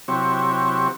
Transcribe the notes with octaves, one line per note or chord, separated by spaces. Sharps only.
C3 F#3 C4 E4 G4 C#6